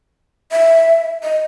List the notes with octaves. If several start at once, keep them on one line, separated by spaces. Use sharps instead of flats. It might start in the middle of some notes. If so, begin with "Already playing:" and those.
E5
D#5